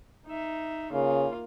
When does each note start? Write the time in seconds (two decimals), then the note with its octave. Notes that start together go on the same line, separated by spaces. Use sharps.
0.27 D#4 E5
0.92 C#3 A#3 F4